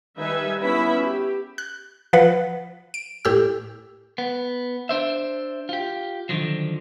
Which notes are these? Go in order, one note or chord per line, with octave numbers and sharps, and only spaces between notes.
D#3 G3 D#4 B4 E5 G#5
B3 C#4 E4 E5 B5
G4
F#6
F3 B4 F#5
D7
A2 G4 E6
B3
D4 C5 E5
F4 G4
D3 D#3 F3 F#3